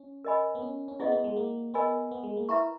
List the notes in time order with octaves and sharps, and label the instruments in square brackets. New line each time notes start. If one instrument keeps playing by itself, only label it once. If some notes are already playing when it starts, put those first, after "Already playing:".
Already playing: [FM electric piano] C#4
[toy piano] A#4 D#5 G#5 B5
[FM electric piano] B3
C#4
C#4
[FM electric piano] B3 [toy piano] E4 G#4 D#5 F#5
[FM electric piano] B3
G#3
A#3
[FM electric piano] B3 [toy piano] A#4 D#5 G#5 B5
[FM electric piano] B3
G#3
A#3
[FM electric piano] E4 [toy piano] B4 E5 A#5 C#6